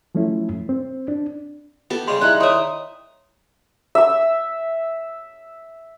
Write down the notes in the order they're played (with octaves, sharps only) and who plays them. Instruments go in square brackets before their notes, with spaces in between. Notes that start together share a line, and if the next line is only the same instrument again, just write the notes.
[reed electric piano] F3 F#3 A3 C#4 E4
C4
D4
[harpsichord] B3 A4 [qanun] G4
[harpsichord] C#3 G3 G#3 [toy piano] C6
[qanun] D#4 E4 A#5 [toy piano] D5 [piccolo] F#6
[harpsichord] D#3 [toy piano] C#5 C6 [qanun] E5 G5 [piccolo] D#6
[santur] E5 E6